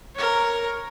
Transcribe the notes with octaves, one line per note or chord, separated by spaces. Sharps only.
A#4 C#5